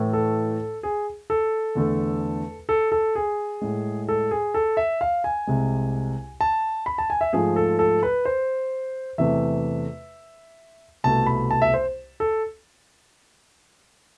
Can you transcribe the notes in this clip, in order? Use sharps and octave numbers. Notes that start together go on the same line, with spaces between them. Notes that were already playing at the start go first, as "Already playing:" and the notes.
Already playing: A2 E3 A3
A4
G#4
A4
E2 D3 A3
A4
A4
G#4
A2 G#3
A4
G#4
A4
E5
F5
G#5
C2 C3 G#3
A5
B5
A5
G#5
E5
G#2 F3 A3 G#4
A4
A4
B4
C5
E2 C3 E3 A3 E5
C2 B2 A3 A5
B5
A5
E5
C5
A4